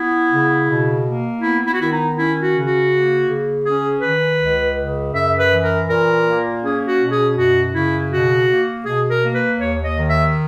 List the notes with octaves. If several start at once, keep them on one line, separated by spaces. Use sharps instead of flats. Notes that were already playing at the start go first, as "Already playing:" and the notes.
Already playing: B3 E4
C#3
B2
A#3
B3 E4
E4
F#4
D#3 E4
D#4
C#4 E4
F#4
C#3
F#4
A#3
C#3
C#4 G#4
D#3 B4
C#2
C#3
F#2 E5
B4
E3
A#4
A#2 A#4
A#3
C#4 G#4
F#4
B2
G#4
F#2 F#4
C#3 E4
B2 F#4
A#3
B2 G#4
A#4
A#3
B4
D#2 C#5
D#5
D#3
E5